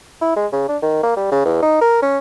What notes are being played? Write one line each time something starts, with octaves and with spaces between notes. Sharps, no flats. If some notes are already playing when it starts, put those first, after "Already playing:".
E4
G#3
C#3
D4
D#3
A#3
G3
C#3
E2
D#4
A#4
C#4